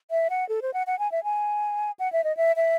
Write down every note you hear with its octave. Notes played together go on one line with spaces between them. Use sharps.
E5
F#5
A4
C5
F#5
F#5
G#5
E5
G#5
F#5
E5
D#5
E5
E5